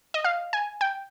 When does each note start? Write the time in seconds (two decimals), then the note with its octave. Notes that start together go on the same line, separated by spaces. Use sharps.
0.14 D#5
0.24 F5
0.53 G#5
0.81 G5